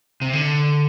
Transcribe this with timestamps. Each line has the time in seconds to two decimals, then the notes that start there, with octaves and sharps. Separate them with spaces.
0.22 C3
0.33 D3